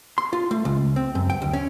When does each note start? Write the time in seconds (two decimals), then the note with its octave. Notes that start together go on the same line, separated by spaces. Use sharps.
0.18 C6
0.33 F4
0.51 A3
0.65 C#2
0.96 C4
1.15 F#2
1.30 G5
1.42 D2
1.53 C#4